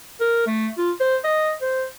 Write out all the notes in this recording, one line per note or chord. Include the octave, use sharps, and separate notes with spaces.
A#4
A3
F4
C5
D#5
C5